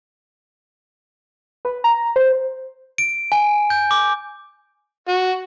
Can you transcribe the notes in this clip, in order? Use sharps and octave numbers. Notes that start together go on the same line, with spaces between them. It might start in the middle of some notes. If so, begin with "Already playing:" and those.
B4
A#5
C5
D7
G#5
G6
D6
F#4